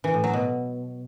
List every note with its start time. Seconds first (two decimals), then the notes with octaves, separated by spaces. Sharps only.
0.04 E3
0.14 A2
0.24 F#3
0.33 B2